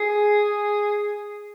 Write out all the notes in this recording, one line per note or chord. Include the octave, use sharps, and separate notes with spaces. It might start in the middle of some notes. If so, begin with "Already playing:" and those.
Already playing: G#4